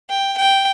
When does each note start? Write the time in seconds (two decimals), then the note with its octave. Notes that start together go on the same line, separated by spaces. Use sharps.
0.09 G5
0.37 G5